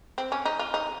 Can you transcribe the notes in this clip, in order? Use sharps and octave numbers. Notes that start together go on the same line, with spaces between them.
C4
C#4
D#4
F4
D#4